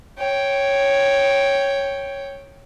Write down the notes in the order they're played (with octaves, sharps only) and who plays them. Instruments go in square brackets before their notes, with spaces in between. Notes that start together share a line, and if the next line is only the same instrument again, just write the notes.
[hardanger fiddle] C#5 G5